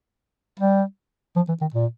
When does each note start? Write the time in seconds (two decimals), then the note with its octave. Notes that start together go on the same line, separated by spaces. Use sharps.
0.59 G3
1.36 F3
1.48 E3
1.61 D#3
1.74 A#2